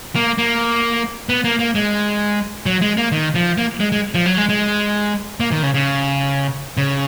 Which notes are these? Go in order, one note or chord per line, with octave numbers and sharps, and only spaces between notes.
A#3
A#3
B3
A#3
A#3
G#3
F#3
G#3
A#3
D#3
F3
A#3
G#3
G#3
F3
F#3
G#3
G#3
A#3
D#3
C#3
C#3
C#3